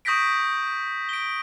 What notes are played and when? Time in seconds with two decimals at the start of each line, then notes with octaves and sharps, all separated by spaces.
0.05 C#6 D#6 G6 A#6 B6 D7
1.09 D7 G7